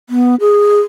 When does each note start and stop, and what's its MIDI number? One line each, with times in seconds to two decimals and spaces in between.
0.09 0.35 59
0.40 0.81 68